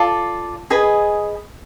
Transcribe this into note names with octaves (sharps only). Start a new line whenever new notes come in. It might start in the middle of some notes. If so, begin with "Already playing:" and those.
Already playing: F4 A4 D5
G#4 B4 D#5 G#5